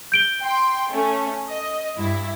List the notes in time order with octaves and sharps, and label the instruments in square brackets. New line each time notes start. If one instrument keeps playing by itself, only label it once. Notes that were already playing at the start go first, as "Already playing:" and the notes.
[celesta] G6 D7 G7
[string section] G5 C6
A3 C#4
D#5
G2 E4